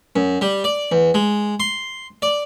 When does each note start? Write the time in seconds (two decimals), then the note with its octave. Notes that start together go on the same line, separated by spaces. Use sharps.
0.16 F#2
0.41 G3
0.64 D5
0.92 E2
1.14 G#3
1.60 C6
2.22 D5